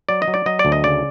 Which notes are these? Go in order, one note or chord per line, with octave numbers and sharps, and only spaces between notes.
F#3 D5
D#5
F#3
D5
F#3 D#5
D5
D2
D#5
C#3 D5